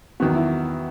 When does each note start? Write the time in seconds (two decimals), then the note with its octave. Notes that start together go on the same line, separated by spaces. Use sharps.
0.20 E2 D#3 F#3 B3 F#4
0.35 E4